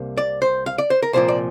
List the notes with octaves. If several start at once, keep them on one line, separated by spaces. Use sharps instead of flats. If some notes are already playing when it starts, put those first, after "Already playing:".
Already playing: C2 C3 A#3
D5
C5
F5
D5
C5
A#4
C2 A#2 F3 A#3 C5
D5